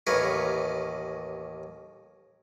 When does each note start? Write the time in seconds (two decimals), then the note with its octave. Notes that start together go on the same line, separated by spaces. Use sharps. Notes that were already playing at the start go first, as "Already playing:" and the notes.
0.07 A1 D#2 C#4 A#4 B4